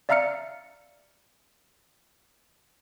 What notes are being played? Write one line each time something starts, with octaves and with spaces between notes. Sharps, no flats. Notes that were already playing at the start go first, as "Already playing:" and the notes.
D5 E5 F5 A#5 F6 C#7